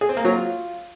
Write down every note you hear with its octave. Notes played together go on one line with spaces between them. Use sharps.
G#4
C4
A#3
F#3
F4